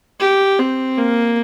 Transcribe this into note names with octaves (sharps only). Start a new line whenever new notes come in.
G4
C4
A#3